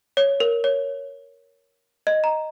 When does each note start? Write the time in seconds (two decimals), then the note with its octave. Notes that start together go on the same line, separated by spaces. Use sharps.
0.17 C#5
0.40 A#4
0.64 C#5
2.07 D#5
2.24 A#5